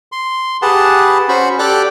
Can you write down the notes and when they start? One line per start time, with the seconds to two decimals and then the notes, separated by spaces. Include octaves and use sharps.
0.12 C6
0.62 G4 G#4 B4 F#5 A5
1.29 C#4 F#4 C5 B5 C#6
1.59 G4 A4 D5 G5 D6 F#6